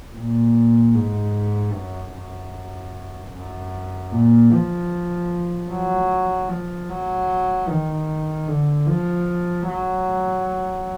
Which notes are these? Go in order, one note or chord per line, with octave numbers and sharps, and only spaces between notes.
A#2
G#2
F#2
F#2
F#2
A#2
F3
F#3
F3
F#3
D#3
D3
F3
F#3